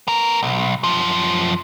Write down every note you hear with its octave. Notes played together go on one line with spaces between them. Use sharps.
B3 A#4
B1
F#2 F3